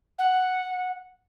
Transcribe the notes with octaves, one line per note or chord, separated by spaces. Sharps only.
F#5